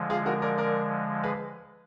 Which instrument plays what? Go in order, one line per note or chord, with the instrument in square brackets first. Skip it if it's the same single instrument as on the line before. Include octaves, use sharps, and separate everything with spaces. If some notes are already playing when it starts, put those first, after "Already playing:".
Already playing: [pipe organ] D3 F3 G#3
[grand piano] F4 G#4
F#4 A#4
A#4 D5
A#4 D5
G#4 B4